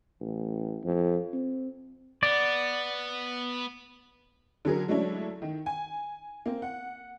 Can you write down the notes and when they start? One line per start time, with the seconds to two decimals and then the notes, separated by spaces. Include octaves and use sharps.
0.20 A1
0.84 F2
1.33 C4
2.23 B3 D5
4.65 D3 F#3 G#4 A#4
4.88 F#3 G#3 A3 C#4 D4 E4
5.42 D#3
5.66 G#5
6.46 A#3 C4
6.62 F#5